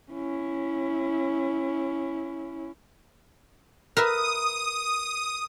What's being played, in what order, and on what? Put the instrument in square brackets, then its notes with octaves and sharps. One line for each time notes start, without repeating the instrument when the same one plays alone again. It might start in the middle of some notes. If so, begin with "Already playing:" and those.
[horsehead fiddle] C#4 E4
[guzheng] A#4 B4 E5 [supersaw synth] D#6